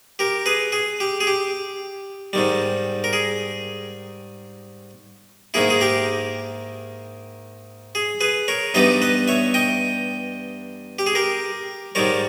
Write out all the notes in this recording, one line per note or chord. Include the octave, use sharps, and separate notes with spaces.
G4 A#4
G#4 B4
G#4
G4
G#4
G4
G#2 D#3 G3
A#4
G#4
G#2 D#3 A#3 E4 G#4
G#4
G4 A#4
G#4
G#4 B4
A#4 C#5
G2 E3 G3 B3 D#4 B4 D#5
B4 D#5
C#5 E5
D#5 G5
G4
G#4
G4 A#4
G#2 D#3 G3 A#4 C#5